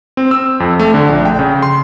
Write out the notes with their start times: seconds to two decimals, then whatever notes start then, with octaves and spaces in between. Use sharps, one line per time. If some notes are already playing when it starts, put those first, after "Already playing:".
0.17 C4
0.31 E6
0.60 F2
0.80 A3
0.94 D3
1.09 A#1
1.25 G5
1.39 C#3
1.62 C6